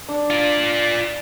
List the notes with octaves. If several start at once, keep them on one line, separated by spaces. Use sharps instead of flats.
D4
F4 D5